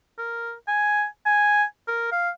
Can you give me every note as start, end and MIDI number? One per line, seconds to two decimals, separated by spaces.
0.18 0.53 70
0.68 1.05 80
1.26 1.64 80
1.88 2.08 70
2.12 2.30 77